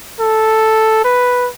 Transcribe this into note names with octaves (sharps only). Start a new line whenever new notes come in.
A4
B4